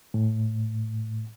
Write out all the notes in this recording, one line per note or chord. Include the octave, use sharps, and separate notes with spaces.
A2